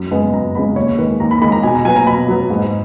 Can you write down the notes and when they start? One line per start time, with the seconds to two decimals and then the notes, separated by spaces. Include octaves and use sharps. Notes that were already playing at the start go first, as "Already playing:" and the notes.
Already playing: F#2
0.11 C#3 G#3 B3
0.34 F#2 A#5
0.55 C#3 G#3 B3 B5
0.76 D#2 C#5
0.98 D#3 G#3 B4
1.20 D#2 A#5
1.31 B5
1.41 D#3 G#3 B5
1.52 A#5
1.63 B2 G#5
1.74 A#5
1.85 F#3 B3 G#5
1.96 A#5
2.07 B2 B5
2.28 F#3 B3
2.50 G#2